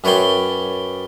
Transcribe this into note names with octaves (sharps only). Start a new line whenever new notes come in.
F#2 B4 C#5 D5 G5 C6